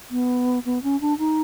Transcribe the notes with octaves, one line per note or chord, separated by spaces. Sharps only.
B3
B3
C#4
D4
D#4